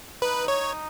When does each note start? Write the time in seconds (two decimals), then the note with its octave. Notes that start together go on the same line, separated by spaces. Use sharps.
0.22 D#4 B4
0.48 C#5